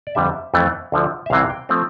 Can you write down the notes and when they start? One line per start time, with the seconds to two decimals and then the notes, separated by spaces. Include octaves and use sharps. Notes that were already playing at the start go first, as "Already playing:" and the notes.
0.07 D5
0.15 F2 D3 G3 E5
0.54 F2 E3 A3
0.92 D2 D3 F3
1.26 E5
1.30 C2 C3 E3 F5
1.50 G5
1.69 F3 A3 C4